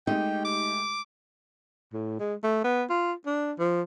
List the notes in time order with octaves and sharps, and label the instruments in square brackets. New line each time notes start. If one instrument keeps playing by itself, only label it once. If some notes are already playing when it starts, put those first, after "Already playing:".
[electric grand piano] G#3 A3 G4 [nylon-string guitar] D#4 [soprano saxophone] G5
[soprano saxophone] D6
[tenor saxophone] A2
G#3
A3
B3
F4
D4
F3